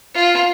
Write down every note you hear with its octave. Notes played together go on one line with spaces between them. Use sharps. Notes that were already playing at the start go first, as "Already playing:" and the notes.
F4